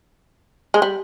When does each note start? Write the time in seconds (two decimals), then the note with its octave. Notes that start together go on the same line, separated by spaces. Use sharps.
0.74 G#3
0.82 G3